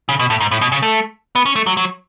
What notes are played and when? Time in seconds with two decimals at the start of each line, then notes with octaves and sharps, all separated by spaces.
0.09 C#3
0.19 B2
0.30 A2
0.41 G#2
0.51 A2
0.61 B2
0.72 C#3
0.83 A3
1.36 B3
1.46 C#4
1.56 A3
1.67 F#3
1.77 F#3